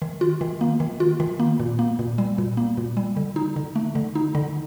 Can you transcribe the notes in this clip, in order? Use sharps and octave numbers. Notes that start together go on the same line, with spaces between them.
D#3
F4
D#3
A#3
D#3
F4
D#3
A#3
A#2
A#3
A#2
G3
A#2
A#3
A#2
G3
D3
D#4
D3
A3
D3
D#4
D3